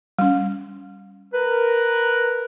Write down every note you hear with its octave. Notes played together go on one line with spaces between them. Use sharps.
G3 C#4
A#4 B4